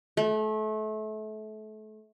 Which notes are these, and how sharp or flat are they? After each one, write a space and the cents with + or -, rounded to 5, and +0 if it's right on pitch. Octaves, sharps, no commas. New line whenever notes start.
A3 -30